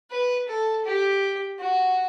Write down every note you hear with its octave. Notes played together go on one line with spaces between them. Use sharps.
B4
A4
G4
F#4